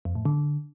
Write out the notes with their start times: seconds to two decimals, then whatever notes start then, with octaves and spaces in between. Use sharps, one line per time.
0.05 F2
0.15 A2
0.25 D3